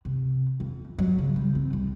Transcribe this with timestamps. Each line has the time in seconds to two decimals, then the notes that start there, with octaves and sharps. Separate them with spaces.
0.05 C3
0.60 F2
0.99 F#3
1.19 C#3
1.36 G3
1.55 C4
1.73 C2